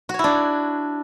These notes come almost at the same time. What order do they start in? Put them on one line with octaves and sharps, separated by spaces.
F#4 C#5 E4 D4